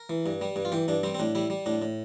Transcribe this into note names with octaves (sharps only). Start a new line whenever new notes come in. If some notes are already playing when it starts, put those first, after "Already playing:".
Already playing: A#4
E3
G2
G3
G2
F4
E3 G4
G2 D4
G3 C4
C4
A2 D4
G3 E4
G3
A2 D4
A2